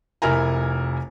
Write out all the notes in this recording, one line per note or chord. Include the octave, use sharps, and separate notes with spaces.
F1 E4 A#4 G#5 A#5